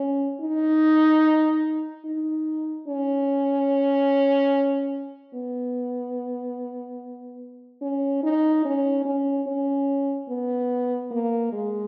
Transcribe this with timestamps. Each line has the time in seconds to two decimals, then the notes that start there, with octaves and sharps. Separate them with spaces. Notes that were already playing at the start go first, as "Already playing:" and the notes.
Already playing: C#4
0.41 D#4
2.05 D#4
2.87 C#4
5.34 B3
7.82 C#4
8.23 D#4
8.65 C#4
9.05 C#4
9.47 C#4
10.29 B3
11.11 A#3
11.52 G#3